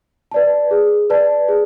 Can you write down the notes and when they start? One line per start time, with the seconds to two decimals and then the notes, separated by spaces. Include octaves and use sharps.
0.31 B4 D5 A5
0.71 G#4
1.10 B4 D5 A5
1.48 G#4